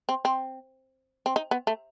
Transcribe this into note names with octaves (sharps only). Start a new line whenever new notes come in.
C4
C4
C4
D#4
B3
A3